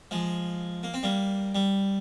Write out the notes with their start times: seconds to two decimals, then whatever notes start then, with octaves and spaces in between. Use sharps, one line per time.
0.11 F3 G#3
0.83 A#3
0.94 C4
1.03 G3 A#3
1.55 G3